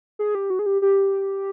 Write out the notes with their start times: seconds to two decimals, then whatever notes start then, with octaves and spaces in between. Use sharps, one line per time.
0.19 G#4
0.35 G4
0.50 F#4
0.59 G#4
0.66 G4
0.82 G4